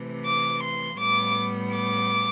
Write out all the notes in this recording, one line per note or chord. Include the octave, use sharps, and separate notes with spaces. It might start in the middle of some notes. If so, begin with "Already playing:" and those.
Already playing: C3 E3 A3
D6
C6
A2 G3 B3 D6
D6